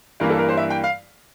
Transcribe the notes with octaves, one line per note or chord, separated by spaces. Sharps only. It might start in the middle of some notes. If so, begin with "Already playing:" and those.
G2 E3 A#3 A#4
A4
A#4
C5
E5
G5
F5